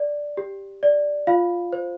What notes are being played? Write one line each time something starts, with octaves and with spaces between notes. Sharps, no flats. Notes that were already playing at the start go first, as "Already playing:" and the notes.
Already playing: D5
G4
D5
F4 F5
C5